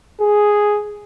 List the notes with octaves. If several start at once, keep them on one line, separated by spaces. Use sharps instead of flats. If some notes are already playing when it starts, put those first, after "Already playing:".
G#4